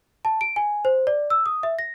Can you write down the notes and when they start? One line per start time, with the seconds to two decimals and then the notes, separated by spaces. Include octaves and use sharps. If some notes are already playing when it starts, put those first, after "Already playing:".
0.25 A5
0.41 D7
0.56 G#5
0.85 C5
1.07 D5
1.30 E6
1.46 D#6
1.63 E5
1.79 A#6